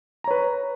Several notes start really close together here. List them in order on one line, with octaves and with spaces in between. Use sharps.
A#5 C#5 B4